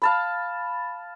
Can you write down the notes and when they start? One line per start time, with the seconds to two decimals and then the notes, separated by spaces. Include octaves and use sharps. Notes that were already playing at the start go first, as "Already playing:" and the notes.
0.02 F5 A5 B5